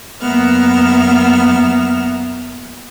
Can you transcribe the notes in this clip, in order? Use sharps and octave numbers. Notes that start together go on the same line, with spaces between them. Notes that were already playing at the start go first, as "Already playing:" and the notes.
F#2 A#3 B3 E5 F6